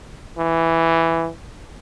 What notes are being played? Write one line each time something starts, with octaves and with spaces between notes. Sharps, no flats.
E3